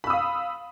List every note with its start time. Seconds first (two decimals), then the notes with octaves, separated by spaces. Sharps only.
0.04 B5
0.07 E6
0.10 D#6
0.13 F5